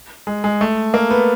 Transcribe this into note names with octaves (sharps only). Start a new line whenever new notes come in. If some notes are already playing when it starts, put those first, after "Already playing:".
G#3
G#3
A3
A#3
B3